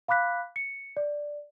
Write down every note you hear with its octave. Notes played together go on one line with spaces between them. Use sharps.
F5 B5 D6 F#6 B6
C#7
D5